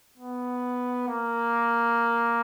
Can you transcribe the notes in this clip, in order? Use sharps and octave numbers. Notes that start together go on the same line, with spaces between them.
B3
A#3